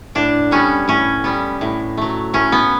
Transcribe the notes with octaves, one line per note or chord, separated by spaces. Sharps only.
A2 D4
G3 B3 C#4
A2 C#4
G3 B3
A2
F#3 A3
A2 C#4
B3